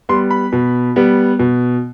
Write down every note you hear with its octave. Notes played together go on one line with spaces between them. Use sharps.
G3 B3 C6
B5
B2
G3 B3
B2